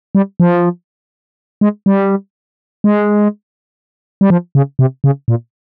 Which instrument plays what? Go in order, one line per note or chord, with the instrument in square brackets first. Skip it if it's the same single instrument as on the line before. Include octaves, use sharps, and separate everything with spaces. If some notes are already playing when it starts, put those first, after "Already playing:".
[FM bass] G3
F3
G#3
G3
G#3
G3
F3
C#3
C3
C#3
A#2